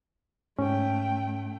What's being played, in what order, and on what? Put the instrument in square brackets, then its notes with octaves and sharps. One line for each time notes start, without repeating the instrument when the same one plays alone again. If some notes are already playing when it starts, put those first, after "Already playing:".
[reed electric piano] G#2 C#4 [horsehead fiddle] A3 G5